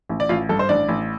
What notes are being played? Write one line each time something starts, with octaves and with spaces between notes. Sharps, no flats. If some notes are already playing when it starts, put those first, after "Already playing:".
A1
D5
A1 F4 F5
G2 A4
C5
A1 D4 D5
A1